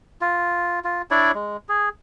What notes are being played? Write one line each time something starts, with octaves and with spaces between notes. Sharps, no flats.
F4
F4
D4 E4 C#5 D5
G#3
G#4